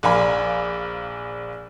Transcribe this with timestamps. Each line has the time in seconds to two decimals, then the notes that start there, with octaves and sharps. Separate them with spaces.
0.03 A#1 A#4 D5 F5 G#5 B5